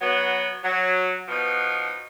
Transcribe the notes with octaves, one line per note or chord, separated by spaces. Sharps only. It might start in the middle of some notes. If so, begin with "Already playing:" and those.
F#3 B3
F#3
B2 F3 B3 D#4